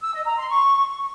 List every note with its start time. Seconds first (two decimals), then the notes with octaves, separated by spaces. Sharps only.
0.02 E6
0.14 D#5
0.26 A#5
0.37 C6
0.49 C#6